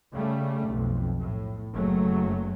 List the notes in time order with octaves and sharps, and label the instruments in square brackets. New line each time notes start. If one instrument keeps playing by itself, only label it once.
[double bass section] C#3 G3 A3
B1 F2
A2
F#1 F#3 A3